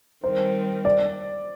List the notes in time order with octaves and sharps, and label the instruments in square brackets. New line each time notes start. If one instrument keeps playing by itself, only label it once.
[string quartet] D#3 G3 C4 [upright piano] C5
[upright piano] D5